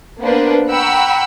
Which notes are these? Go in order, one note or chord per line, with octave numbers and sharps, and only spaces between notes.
A#3 B3 D4 B4 C5
F#5 G5 A#5 B5 C#6 E6